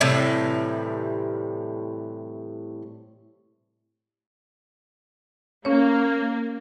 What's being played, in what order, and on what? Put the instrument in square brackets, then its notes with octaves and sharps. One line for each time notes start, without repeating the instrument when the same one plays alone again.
[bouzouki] A2 C3 E3 G3
[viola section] A#3 [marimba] C#4 C#5